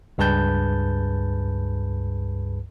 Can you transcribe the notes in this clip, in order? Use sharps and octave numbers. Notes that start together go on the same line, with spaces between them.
C#2 G2 G#4 B4 A5 G6